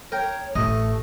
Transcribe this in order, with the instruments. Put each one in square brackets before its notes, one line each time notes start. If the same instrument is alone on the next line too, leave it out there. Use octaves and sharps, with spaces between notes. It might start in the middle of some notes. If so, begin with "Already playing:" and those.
[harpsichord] A#4 G5 [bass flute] C#5
[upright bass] A1 [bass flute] A3 [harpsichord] D#5